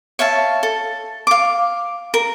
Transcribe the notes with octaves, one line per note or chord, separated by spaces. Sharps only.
C#5 E5 F5 A5
A4
F5 D6
A#4